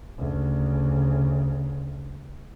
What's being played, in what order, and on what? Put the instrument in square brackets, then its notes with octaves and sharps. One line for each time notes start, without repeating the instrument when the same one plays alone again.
[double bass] D2 C#3